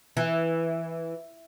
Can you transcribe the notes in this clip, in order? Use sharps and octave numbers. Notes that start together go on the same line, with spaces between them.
E3